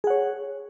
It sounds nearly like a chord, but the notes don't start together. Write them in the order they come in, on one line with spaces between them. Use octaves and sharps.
G#4 F#5 C#5